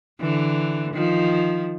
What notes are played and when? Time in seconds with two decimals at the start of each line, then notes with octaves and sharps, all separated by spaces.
0.20 D3 E3
0.94 D#3 F3